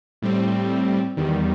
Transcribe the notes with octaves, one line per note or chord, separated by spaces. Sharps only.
A2 G3 C4
E2 D#3 G3